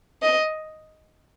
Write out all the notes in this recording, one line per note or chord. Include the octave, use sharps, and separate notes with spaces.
D#5